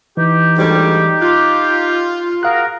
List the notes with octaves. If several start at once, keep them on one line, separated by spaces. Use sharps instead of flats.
E3 D#4 G4
D2 G#2 G3
F4 F#6
F#4 G#4 A#4 F5 F#6